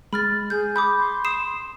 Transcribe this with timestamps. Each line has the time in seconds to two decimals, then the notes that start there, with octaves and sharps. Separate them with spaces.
0.13 G#3 B5 F6 A6
0.50 G#4 G6
0.76 B5 D6 D#6 G6
0.99 C6
1.25 D#6 C7 E7